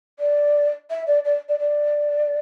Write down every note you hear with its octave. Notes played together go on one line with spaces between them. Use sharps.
D5
E5
D5
D5
D5
D5